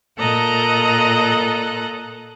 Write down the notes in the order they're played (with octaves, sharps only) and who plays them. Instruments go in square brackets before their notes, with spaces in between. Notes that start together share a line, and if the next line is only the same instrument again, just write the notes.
[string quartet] A#2 A4 D#5 A#5 F#6